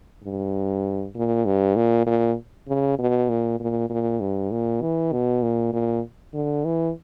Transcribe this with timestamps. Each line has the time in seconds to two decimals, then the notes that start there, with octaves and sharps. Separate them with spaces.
0.24 G2
1.16 A#2
1.46 G2
1.76 A#2
2.07 A#2
2.68 C#3
2.99 B2
3.29 A#2
3.60 A#2
3.90 A#2
4.20 G2
4.51 A#2
4.81 E3
5.12 B2
5.42 A#2
5.73 A#2
6.34 D3
6.65 E3